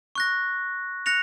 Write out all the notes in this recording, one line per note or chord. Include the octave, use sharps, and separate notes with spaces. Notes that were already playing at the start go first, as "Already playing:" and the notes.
C#6 F#6 A#6
F#6 A#6 C#7 F7